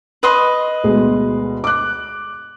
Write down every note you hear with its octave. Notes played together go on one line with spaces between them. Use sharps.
B4 D#5 C6
D2 B2 G#3
D6 F#6